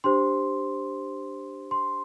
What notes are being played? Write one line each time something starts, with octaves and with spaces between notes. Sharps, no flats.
D4 G4 C5 C6
C6